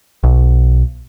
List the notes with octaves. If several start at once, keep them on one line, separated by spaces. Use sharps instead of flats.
B1